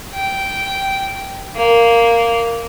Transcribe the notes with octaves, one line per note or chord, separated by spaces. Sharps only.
G5
A#3